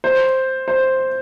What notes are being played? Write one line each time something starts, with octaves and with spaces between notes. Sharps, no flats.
C5
C5